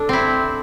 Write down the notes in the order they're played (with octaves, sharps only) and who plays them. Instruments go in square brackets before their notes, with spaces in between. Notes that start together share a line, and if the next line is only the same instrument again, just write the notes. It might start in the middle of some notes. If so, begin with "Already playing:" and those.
Already playing: [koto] D4 [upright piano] A4
[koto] C4 E4